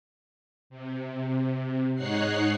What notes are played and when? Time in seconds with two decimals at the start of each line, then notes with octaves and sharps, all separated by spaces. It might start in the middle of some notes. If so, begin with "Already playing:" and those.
0.70 C3
1.95 G#2 D#4 C#5 F#5 F#6 C7